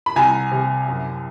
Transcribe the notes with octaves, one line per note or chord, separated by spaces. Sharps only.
B5
C2 G#5 A#5
C3
F#2